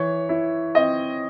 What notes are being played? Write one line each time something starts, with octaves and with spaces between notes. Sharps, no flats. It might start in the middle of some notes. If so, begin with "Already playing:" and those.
Already playing: E3 C#5
E4
C4 D#5